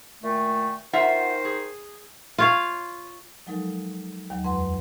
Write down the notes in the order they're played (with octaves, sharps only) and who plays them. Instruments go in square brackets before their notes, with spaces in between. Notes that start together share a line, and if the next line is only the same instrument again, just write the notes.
[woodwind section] A#2 D#3 A3
[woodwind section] D#3 D#4 C5 [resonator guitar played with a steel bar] F4 E5 F#5
[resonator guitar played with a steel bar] G#4
[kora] F4 C#5 F5
[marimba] F3 F#3 G#3 D#4 A4 A#4
D#2 D#3 F#3
F2 G#3 B4 F#5 C6